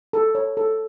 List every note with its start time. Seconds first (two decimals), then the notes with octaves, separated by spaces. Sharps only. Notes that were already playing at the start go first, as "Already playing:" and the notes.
0.13 A4
0.35 C#5
0.57 A4